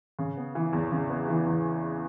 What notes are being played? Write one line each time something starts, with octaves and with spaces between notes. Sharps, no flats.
C#3
B3
E3
E2
C#3
B3
E3
E2